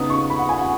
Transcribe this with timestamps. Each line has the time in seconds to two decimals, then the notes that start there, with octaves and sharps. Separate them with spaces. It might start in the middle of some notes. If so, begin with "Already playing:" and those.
Already playing: C#3 B3 D#4 D#6
0.10 C#6
0.30 B5
0.39 F#5
0.49 G#5
0.58 F#5